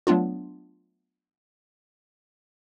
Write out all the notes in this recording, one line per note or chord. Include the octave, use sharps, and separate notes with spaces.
F#3 A3 B3 D4 F4